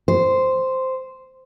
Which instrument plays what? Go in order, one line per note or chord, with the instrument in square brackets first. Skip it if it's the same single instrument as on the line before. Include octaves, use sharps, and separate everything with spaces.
[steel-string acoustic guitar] C5